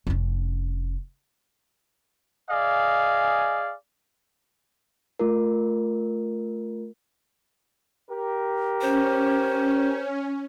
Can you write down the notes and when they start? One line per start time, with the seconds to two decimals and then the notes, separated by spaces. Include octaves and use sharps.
0.07 F1 C#4
2.51 G#4 D5 D#5 F5 G#5
5.19 A3 F4 A#4
8.10 G4 A#4
8.81 C#4 C5